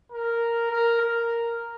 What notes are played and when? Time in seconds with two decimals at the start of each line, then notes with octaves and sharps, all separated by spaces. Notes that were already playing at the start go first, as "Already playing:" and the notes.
0.12 A#4
0.71 A#4
1.00 A#4